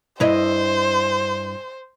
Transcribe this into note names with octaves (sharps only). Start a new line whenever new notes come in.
G2 E4 C5 D#5